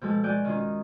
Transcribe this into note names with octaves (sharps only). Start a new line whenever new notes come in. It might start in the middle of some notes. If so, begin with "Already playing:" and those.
B2 F3 G#3 A4
G#3 F#4 D5 F#5 G#5 G6
D#3 C#4 F4